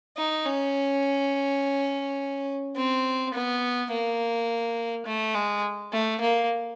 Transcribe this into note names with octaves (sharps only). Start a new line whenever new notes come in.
D#4
C#4
C4
B3
A#3
A3
G#3
A3
A#3